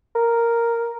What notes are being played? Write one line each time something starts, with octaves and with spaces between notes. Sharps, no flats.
A#4